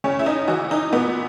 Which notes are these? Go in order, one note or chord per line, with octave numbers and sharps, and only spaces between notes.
C#3 C#4
E4
D#4
E3 F#4
D#4
A#2 B3